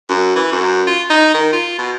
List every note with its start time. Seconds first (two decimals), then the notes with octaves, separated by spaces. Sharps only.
0.10 F#2
0.36 E3
0.52 F#2
0.87 F4
1.10 D#4
1.34 D#3
1.53 F4
1.78 B2